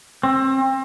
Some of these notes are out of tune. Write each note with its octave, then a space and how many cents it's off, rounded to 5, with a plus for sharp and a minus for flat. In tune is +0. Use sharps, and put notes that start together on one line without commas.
C4 +30